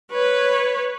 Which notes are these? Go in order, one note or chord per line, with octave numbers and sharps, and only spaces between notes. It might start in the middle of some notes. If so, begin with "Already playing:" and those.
B4 C#5